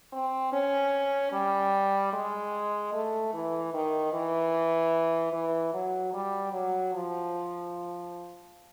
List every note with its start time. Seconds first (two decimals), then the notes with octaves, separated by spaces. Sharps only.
0.13 C4
0.53 C#4
1.33 G3
2.13 G#3
2.93 A3
3.34 E3
3.74 D#3
4.13 E3
5.33 E3
5.74 F#3
6.14 G3
6.52 F#3
6.94 F3